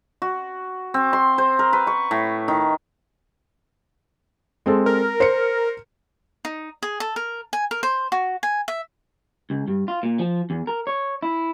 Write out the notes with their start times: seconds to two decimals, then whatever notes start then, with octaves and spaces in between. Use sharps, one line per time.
0.22 F#4
0.94 C4
1.13 C6
1.38 C5
1.59 A#4
1.73 B4
1.87 C#6
2.11 A2
2.48 D#3
4.66 G#3 C4 A4
4.86 A#4
5.20 C5 C#7
6.45 D#4
6.83 G#4
7.00 A4
7.16 A#4
7.53 G#5
7.71 A#4
7.83 C5
8.12 F#4
8.43 G#5
8.68 E5
9.50 C#2
9.68 G2
9.88 F4
10.03 A#2
10.19 F3
10.50 E2
10.67 A#4
10.87 C#5
11.23 E4